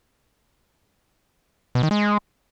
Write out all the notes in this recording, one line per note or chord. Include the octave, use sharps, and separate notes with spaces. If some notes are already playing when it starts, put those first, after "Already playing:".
B2
D#3
G#3